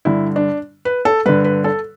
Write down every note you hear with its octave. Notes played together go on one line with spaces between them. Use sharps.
G2 D3 E4
D4
B4
A4
G2 D3 B4
B4
A4